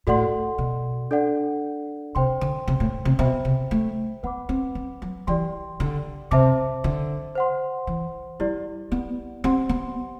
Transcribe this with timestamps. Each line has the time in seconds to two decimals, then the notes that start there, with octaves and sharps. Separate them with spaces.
0.07 A2 F#4 A4 D5 F#5 C6
0.58 B2
1.11 D4 A4 D5 F#5
2.15 C3 C5 G5 C6
2.41 D3
2.68 C3
2.80 A2
3.05 C3
3.19 B2 C5 E5 G5 B5
3.45 C3
3.71 A3
4.23 B3 B4 F#5 B5 D6
4.49 C4
4.75 C4
5.02 F#3
5.27 E3 G4 D5 G5 C6
5.80 D3
6.31 C3 C5 E5 A5 D6
6.84 D3
7.35 C5 F#5 C6
7.87 E3
8.40 G3 E4 G4 D5
8.92 B3
9.44 C4 G4 C5 F#5 C6
9.69 B3